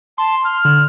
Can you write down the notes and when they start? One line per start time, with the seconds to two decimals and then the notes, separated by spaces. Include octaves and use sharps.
0.18 A5 C6
0.44 F6
0.65 D3